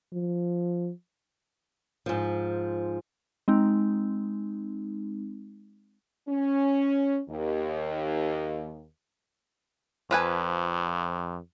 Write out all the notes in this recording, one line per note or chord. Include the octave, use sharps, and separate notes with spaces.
F3
G#2 F3
G#3 C4 D#4
C#4
D#2
F2 F3 B4 G#5